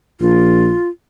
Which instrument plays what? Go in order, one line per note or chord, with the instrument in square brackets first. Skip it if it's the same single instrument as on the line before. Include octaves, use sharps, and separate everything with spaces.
[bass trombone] A#1 [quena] F4